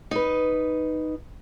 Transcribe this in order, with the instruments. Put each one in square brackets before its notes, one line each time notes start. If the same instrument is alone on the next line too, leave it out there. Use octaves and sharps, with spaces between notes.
[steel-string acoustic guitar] D#4 B4